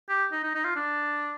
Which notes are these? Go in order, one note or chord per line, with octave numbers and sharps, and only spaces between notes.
G4
D#4
D#4
D#4
F4
D4